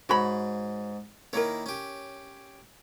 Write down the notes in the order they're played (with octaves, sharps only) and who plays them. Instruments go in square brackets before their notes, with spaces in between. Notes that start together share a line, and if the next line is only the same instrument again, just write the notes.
[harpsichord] G#2 [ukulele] F#4 C#5 B5
[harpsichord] D#3 A#3 E4 [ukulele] A#4 C#5
[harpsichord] C#4 G4